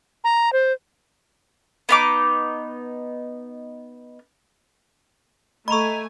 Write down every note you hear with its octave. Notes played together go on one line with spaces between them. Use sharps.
A#5
C5
B3 D#4 D6
A3 D#5 G#5 A#5 B5 C#6 F7